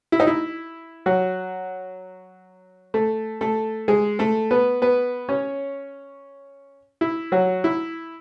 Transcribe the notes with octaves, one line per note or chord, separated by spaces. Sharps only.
E4
D#4
E4
F#3 F#4
A3 A4
A3 A4
G#3 G#4
A3 A4
B3 B4
B3 B4
C#4 C#5
E4
F#3 F#4
E4